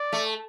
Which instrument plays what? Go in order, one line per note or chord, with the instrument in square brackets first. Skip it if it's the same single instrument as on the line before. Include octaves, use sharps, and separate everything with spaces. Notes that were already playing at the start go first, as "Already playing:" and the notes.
Already playing: [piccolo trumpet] D5
[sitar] A3